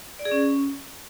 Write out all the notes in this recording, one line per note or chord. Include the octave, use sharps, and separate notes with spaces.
D5
G#4
C#4